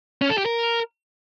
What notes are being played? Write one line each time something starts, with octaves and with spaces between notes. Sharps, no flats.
C#4
A4
G4
A#4